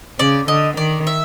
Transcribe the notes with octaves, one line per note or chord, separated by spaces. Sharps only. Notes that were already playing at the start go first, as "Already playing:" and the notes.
C#3 D5
D3 D#5
D#3 D5
E5